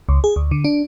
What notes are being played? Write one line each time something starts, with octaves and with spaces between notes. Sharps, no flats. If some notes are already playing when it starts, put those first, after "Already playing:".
C#2
G#4
D2
D3
D4